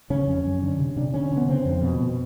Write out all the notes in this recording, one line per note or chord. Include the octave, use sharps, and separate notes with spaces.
C#3 C#4
F2
F#2
D3
C3
C3 D4
D3 C#4
D3
B3
C#3 C4
F2
B2
B2